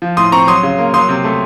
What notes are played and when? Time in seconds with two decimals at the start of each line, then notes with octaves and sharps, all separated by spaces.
0.02 F3
0.17 A2 C6 D#6
0.32 C4 A#5 C#6
0.47 F#3 C6 D#6
0.63 C#3
0.78 A#3
0.94 F#3 C6 D#6
1.09 C3
1.24 A3